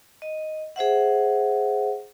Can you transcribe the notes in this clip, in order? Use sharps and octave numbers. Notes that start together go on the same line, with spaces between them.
D#5
G#4 C5 E5 F#5